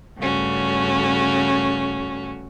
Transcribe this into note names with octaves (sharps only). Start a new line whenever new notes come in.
G2 C#3 A3 C#4 F#4